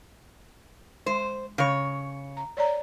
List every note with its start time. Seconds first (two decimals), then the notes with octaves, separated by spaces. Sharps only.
1.06 G#3 C5
1.58 C#3 C#5
2.37 A#5
2.57 C#5 D5 A#5